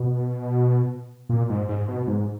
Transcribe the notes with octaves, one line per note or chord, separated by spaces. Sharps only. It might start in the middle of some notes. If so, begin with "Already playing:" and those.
Already playing: B2
A#2
G#2
G#2
B2
G#2